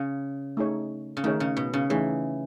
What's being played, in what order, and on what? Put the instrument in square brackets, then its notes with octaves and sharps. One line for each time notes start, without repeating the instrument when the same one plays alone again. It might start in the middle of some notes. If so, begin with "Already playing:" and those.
Already playing: [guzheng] C#3
[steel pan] A3 D#4 G#4 C#5
[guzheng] C#3
[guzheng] D#3 [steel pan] A3 D#4 G#4 C#5
[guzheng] C#3
B2
C#3
[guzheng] E3 [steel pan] A3 D#4 G#4 C#5